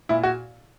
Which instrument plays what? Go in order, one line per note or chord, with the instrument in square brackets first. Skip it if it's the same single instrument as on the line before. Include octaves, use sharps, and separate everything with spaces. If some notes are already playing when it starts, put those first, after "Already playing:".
[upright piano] A#2 E4
F#4